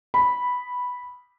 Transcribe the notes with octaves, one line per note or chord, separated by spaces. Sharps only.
B5